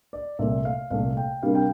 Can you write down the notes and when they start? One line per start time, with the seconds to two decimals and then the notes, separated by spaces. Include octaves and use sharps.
0.13 D5
0.39 C2 A#2 A3 E5
0.65 F5
0.91 C2 A#2 A3 F5
1.17 G5
1.43 C3 G3 A#3 D4 F5
1.55 G5